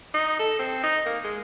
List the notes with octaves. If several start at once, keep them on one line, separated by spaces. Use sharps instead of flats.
D#4
A4
C4
D#4
A#3
G#3